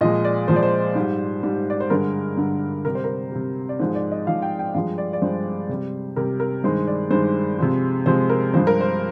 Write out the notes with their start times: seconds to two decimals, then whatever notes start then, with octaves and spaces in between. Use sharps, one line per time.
0.01 A#2 F3 G#3 D#5
0.25 D5
0.48 A#2 F3 G#3 C5
0.56 D5
0.63 C5
0.95 G#2 G3
1.43 G#2 G3
1.70 D5
1.80 C5
1.90 G2 D3 G#3 A#4
2.37 G2 D3 G#3
2.85 C3 G3 A#4
2.95 C5
3.04 A#4
3.32 C3 G3
3.69 D5
3.79 G#2 F3 G#3 C5
3.95 D5
4.12 D#5
4.27 G#2 F3 G#3 F5
4.42 G5
4.59 G5
4.74 G2 F3 G#3 F5
4.98 D5
5.13 D5
5.22 G2 F3 G#3 C5
5.69 C3 G3
6.16 C3 G3 A#4
6.40 A#4
6.64 G2 D#3 G#3 C5
6.87 D5
7.11 G2 D#3 G#3 C5
7.59 C3 F3 G#3
8.06 C3 F3 G#3 C5
8.30 A#4
8.53 G2 F3 G#3 C5
8.67 A#4
8.80 C5